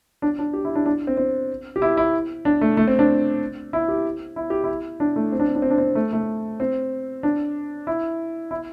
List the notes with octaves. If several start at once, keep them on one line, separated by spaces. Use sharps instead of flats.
D4
D4
G4
E4
D4
D4
C4
C4
G4
E4
E4
D4
A3
A3
C4
D4
E4
G4
E4
G4
E4
D4
A3
C4
D4
C4
D4
C4
D4
C4
A3
A3
C4
D4
E4
E4